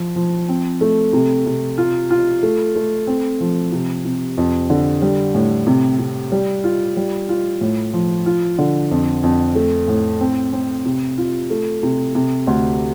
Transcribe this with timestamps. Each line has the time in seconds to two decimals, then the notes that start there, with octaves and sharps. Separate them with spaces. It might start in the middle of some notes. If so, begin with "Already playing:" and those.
Already playing: F3
0.16 F3
0.49 C4
0.81 A3
1.13 C3
1.46 C3
1.78 F4
2.10 F4
2.43 A3
2.75 A3
3.07 C4
3.40 F3
3.72 C3
4.05 C3
4.37 F2
4.70 D3
5.02 G3
5.35 A2
5.67 C3
5.99 C3
6.32 G3
6.64 F4
6.97 G3
7.29 F4
7.61 A2
7.93 F3
8.26 F4
8.58 D3
8.91 F2
9.23 F2
9.55 A3
9.88 A2
10.20 C4
10.53 C4
10.85 C3
11.18 F4
11.50 A3
11.83 C3
12.15 C3
12.47 D2